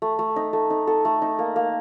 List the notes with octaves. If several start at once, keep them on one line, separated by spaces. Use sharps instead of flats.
A3
A3
D#4
A3
D#4
A4
A3
D#4
A#3
A#3